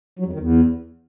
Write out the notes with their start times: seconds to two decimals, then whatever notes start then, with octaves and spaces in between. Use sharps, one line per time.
0.19 F#3
0.26 F2
0.33 D#3
0.39 E2